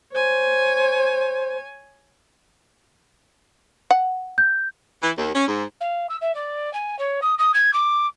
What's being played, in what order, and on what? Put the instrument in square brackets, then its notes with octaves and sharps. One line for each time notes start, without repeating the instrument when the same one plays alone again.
[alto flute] C5 [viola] C#5 G#5
[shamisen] F#5
[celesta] G6
[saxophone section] E3
D#2
C#4
G#2
[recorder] F5
E6
E5
D5
G#5
C#5
D#6
D#6
G#6
D6